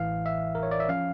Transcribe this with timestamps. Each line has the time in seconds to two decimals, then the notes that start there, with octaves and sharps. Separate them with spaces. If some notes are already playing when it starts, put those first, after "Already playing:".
Already playing: A1 A2 E3 F5
0.26 E5
0.55 A#4
0.63 C#5
0.71 D5
0.80 E5
0.89 F3 C#4 F5